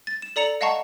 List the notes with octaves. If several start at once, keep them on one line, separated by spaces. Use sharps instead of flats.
A6
E7
A4 D5 A#5 C#7 F7
D#5 F5 F#5 A5 A#5 C#6